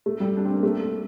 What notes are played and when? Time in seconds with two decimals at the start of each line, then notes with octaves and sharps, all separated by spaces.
0.06 A3
0.20 G3
0.37 D4
0.45 C4
0.55 A#3
0.63 A3